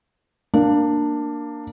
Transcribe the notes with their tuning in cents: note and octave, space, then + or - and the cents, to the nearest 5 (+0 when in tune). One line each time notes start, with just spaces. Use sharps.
A#3 +0 D4 +10